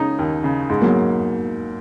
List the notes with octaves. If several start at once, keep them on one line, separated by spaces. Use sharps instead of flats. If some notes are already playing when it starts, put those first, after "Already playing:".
Already playing: C#3 G#3 C#4 D#4
D#2
C#3
G#2 G#3
F#3 A#3